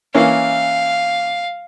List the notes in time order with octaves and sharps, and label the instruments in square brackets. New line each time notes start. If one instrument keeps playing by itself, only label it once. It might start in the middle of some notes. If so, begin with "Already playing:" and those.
[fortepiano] E3 A#3 C#4 [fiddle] F5